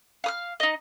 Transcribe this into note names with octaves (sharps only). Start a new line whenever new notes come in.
F5 D#6 F6
D#4 D#5